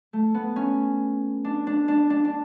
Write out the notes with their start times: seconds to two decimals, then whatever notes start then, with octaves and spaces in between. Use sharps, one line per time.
0.13 A3
0.34 B3
0.56 C#4
1.45 D4
1.67 D4
1.88 D4
2.10 D4
2.25 D4